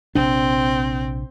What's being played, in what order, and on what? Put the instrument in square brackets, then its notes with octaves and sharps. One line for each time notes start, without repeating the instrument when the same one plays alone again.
[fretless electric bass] A#1 C3 D4 [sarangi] C4